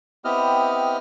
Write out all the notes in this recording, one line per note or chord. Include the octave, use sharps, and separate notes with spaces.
B3 C4 E4 G4 D#5 F6